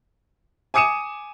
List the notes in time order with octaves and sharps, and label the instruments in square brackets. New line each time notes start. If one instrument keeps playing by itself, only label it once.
[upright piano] G#5 D6 D#6 C#7 D#7 E7